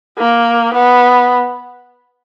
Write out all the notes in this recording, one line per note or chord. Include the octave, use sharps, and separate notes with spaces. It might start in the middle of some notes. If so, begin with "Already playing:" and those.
A#3
B3